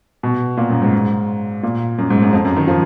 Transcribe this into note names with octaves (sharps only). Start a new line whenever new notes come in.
B2
A#2
F#2
G#2
A#2
F#2
G#2
F#2
F2
F#2
D#3
F3